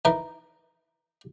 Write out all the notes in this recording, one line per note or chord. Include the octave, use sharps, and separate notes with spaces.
E3 D#4 A#4 B4